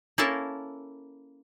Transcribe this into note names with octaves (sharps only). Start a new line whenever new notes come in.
A#3 C#4 E4 A4 A#4 A5